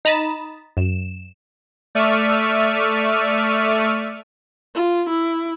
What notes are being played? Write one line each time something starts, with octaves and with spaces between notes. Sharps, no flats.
D#4 A#5 B5 D#6 A6 E7
F#2 E7
A3 D5 E5 C#6 F6 D#7
F4
E4